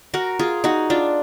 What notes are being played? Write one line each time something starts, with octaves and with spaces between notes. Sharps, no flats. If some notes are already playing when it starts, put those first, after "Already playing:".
F#4 A#4
F4 G#4
D#4 F#4
D4 F4